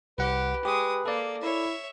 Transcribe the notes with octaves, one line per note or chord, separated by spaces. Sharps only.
C2 G4 B4 F#5
G#3 G4 D#6
A#3 A4 D5
E4 C#5 E5